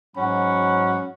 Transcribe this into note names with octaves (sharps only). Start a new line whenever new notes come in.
G#2 F#3 C#4 F#5 B5